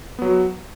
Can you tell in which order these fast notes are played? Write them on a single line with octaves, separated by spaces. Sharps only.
B3 F#3 F#4